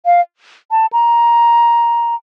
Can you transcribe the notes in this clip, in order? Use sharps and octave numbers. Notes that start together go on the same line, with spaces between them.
F5
A5
A#5